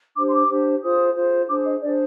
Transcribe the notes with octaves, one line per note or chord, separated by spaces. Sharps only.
D4 G4 C5 D6
C6
D6
D4 G4 C5
F4 G#4 C5 D#6
F4 G#4 C5
D4 G#4 C5 D6
D#5
D4 G#4 C5 D5